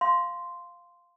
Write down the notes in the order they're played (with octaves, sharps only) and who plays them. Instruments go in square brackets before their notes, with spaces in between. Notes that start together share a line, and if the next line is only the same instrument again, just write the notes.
[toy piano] F5 C6